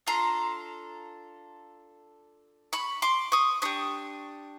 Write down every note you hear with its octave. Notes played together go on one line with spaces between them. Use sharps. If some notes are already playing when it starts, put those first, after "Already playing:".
D4 F4 A4 A#5 C6
B5 C#6
C6 D6
C#6 D#6
D4 G4 C#6 D#6